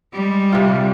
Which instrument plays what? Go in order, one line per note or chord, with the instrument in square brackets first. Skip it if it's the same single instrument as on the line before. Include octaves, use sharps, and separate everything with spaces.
[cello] G3 G#3
[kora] C3 F4